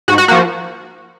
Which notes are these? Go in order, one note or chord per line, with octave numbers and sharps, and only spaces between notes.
G#2 F#4
F#4
F3 A#3 F#4